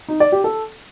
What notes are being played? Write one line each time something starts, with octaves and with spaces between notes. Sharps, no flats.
D#4
D5
G4
A4